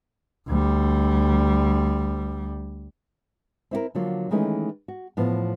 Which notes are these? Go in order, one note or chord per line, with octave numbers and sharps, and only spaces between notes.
D2 G3
C4 E4 F#4 A#4
D3 F3 F#3 A#3 F4
D#3 E3 G#3 A3 C#4
F#4
A2 E3 F3 B3